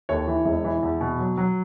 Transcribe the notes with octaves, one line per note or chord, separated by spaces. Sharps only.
D#2 A4 C#5
E3
E1
E3
E2
B2
F#3
F#3